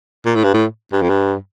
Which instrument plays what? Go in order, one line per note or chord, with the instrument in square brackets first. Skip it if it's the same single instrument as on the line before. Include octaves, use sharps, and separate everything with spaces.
[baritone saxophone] A#2
A2
G2
A2
G2
F2
G2